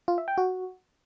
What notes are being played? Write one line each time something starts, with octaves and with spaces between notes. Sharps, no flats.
F4
E5
G5
F#4